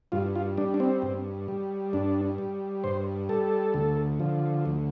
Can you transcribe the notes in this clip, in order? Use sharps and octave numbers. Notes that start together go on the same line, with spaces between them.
G2 F4
F4
G3 D4
D4
C4
G2
G3
G2 D4
G3
G2 C5
G3 A4
D2
D3 F3
D2